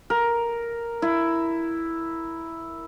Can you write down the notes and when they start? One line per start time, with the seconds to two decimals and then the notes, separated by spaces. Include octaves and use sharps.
0.10 A#4
1.02 E4